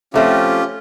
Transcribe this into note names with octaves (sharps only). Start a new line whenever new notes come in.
F3 A3 C4 C#4 F4 G4